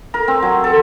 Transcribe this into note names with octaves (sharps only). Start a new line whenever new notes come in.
A#4
C4
F#3
A4